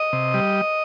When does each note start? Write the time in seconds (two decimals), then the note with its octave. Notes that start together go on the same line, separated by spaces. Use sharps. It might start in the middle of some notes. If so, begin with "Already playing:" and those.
Already playing: D#5
0.13 C3
0.34 G3